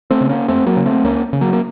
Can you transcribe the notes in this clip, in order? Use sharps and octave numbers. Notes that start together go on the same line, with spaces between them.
A3 C4
C#3
A#3 C#4
F2 A3 C4
F#3 A#3
C#3
A3 C4
C#2 A#3 C#4
C#3
F#3 A#3
A#3